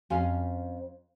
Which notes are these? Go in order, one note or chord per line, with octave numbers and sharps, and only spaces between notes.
F2 C#4 F#4 C5 F5 G#5